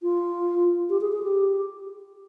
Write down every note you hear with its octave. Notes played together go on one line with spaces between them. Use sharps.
F4
G4
G#4
G#4
G4